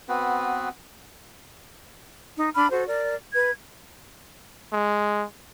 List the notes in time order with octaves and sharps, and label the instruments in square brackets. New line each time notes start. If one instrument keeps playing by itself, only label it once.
[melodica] B3 C4 F#4 B4
[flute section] D#4
D4 B5 F6
F#4 A4 C5
A#4 D5
B4 G#6
[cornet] G#3